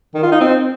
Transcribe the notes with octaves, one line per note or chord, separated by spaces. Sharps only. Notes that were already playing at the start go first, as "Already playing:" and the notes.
D#3
F4
D#4
C4